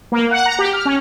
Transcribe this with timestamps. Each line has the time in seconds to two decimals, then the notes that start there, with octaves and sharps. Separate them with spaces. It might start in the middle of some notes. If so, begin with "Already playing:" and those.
0.12 A#3
0.31 F#5
0.46 A#5
0.59 G4
0.73 F6
0.85 C#4